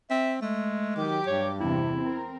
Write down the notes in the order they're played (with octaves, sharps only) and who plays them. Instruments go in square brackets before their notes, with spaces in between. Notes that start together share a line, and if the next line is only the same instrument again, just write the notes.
[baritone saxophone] C4 [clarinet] E5
[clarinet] G#3 [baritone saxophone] A3
[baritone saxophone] D#3 [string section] F#3 G4 D6
[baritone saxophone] G2 [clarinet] C#5
[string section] E2 C3 [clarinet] E4
[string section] C4 A#4